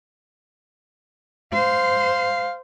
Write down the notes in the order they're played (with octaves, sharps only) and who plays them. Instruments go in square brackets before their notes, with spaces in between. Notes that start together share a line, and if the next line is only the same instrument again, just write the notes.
[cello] C5 [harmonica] F5